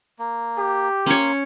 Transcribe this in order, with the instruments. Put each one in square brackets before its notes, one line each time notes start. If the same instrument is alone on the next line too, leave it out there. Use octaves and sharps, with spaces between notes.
[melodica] A#3
[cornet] G4
[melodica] A#3 C6 [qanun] C#4 C#5